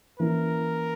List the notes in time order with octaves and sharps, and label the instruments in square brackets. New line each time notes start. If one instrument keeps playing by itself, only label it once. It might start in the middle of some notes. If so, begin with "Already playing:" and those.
[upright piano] E3 A#3 C#4 E4 [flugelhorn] A#4